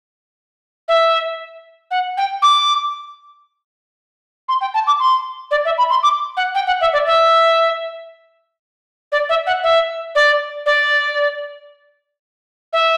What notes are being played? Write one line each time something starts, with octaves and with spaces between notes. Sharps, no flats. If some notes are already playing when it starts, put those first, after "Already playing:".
E5
F#5
G5
D6
C6
G5
A5
D6
C6
D5
E5
B5
C6
D6
F#5
G5
F#5
E5
D5
E5
D5
E5
F#5
E5
D5
D5
E5